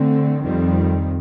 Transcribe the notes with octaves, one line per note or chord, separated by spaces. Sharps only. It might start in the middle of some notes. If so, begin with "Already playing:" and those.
Already playing: D3 A3 C4
F2 D#3 G3 C4